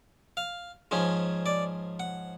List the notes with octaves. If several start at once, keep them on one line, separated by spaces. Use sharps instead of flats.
F5
G#2 F3 G#3 C#4
D5
F#5